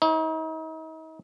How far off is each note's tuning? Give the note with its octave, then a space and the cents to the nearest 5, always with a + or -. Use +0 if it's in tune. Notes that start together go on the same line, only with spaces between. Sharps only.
D#4 +40 C#5 -45